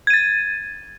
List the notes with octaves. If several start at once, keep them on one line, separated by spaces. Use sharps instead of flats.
G#6 A6 D#7